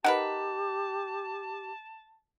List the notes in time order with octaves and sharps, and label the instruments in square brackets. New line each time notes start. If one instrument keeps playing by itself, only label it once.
[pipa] D#4 A#4 B4 [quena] G4 [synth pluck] F#5 [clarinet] A5